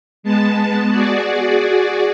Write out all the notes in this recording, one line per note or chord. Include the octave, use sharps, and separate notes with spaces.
G#3 B3 A5
F#4 G#4 D5